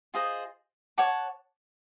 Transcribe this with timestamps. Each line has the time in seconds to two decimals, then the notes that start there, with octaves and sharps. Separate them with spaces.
0.14 F4 G#4 C5 D#5
0.98 C#5 F#5 A5 D6